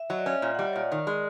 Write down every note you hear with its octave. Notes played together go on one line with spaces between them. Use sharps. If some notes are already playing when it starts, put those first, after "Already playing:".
Already playing: E5
F#3 D#5
D5
C#4 F5
A#2 E5
G3 F#5
C#5
A#2 D5
D#3
G#3